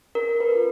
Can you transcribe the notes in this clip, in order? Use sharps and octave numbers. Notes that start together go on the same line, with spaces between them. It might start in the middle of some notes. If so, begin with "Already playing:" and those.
C#4 A#4
B4
F4 A4